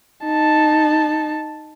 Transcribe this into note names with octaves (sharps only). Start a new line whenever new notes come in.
D#4 A5